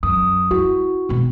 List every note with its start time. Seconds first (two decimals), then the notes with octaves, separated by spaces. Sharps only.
0.03 F#2 D#6
0.51 E4 F#4
1.09 B2 B3